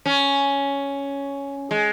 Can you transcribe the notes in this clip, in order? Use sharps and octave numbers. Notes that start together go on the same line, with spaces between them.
C#4
G#3